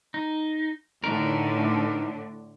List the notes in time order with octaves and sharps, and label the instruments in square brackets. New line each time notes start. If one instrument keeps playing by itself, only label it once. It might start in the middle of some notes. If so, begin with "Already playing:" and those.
[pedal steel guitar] D#4
[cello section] A2 D3 [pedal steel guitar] E3 D#4 A#4